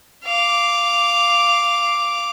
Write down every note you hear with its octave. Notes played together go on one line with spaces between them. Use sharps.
F5 D6